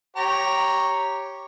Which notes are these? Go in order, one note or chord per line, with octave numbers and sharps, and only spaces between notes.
G4 C#5 A#5